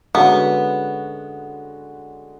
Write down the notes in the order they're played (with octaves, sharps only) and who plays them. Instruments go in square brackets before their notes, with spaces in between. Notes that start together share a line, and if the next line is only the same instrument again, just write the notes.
[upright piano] D3 G#3 C#4 F#4 [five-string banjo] B3